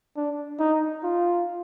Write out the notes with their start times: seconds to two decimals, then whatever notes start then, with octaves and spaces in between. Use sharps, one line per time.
0.16 D4
0.59 D#4
1.03 F4